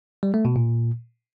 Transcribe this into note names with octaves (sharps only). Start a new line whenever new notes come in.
G3
A3
B2
A#2